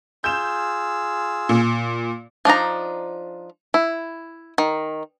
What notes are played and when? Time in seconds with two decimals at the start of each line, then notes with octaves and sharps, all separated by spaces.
0.24 F4 G#4 E6 G6 E7
1.49 A#2
2.45 F3 D4 D#4 A#5
3.74 E4
4.58 D#3